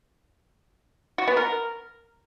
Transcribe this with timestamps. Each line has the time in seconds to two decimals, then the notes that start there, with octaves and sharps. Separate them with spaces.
1.18 F#4
1.28 B3
1.37 A#4